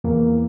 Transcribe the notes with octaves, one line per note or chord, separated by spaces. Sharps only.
E2 E3 A#3